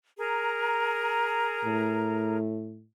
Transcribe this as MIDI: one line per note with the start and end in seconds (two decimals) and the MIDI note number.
0.18 2.37 68
0.18 2.37 70
0.18 2.37 82
1.65 2.86 45